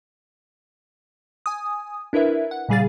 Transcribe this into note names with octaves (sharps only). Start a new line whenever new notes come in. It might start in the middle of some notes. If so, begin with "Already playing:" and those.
G#5 D#6
D4 E4 A#4 B4 E5
F#5
A#2 C#3 G3 G#4 F5 A6